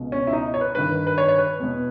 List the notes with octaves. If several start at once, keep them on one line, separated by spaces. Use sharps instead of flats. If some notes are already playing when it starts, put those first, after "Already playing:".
Already playing: C#2 B2
C#4
E4
D#4
C#5
B4
G2 D#3 B4
B4
C#5
C#5
B4
E2 B2